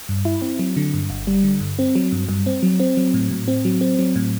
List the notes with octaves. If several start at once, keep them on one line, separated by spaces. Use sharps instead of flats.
G2
E4
C4
F#3
D3
G2
G1
G3
D3
G2
C4
F#3
G2
G2
C4
F#3
C4
F#3
A2
A2
C4
F#3
C4
F#3
A2